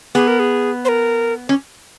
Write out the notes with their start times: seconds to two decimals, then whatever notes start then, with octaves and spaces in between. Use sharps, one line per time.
0.15 B3 G#4
0.28 A#4
0.39 G#4
0.85 C5
0.89 A#4
1.49 C#4